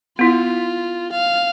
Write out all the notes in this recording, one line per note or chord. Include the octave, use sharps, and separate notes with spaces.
B3 E4 F4
F5